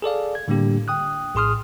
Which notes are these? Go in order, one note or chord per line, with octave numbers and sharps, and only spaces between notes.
G#4 A4 D5 F5
G#6
A2 D3 G3 A#3 D4 G4
G5 D#6 F#6
A#1 A2 G#4 C6 D#6 F6